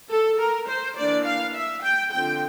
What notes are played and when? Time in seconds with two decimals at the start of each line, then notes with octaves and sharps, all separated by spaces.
0.10 A4
0.39 A#4
0.68 C5
0.96 E3 A#3 D4 D5
1.25 F5
1.54 E5
1.83 G5
2.12 D3 F3 C4 G5